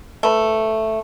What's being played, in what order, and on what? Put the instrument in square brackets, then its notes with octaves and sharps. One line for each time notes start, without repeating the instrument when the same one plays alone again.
[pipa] A3 B4